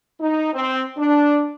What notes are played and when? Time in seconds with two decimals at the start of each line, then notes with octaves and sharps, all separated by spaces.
0.20 D#4
0.53 C4
0.97 D4